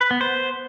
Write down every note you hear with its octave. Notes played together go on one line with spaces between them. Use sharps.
B4
B3
C5